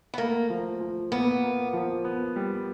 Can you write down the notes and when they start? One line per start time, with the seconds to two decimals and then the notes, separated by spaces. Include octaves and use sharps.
0.14 B3
0.18 A3 A#3
0.50 F3
0.80 F3
1.12 A#2 B3
1.43 A#3
1.73 F3
2.05 B3
2.36 G3